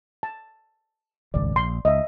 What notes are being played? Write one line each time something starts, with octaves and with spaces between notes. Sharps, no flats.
A5
D#1 G#1 C#2 D5
A#1 C6
C#2 D#5 E5